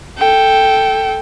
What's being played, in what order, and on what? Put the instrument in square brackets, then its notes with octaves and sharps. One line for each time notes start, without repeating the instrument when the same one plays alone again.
[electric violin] A4 G5